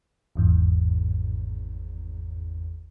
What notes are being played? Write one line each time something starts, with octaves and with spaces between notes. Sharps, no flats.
G#1 E2 G#2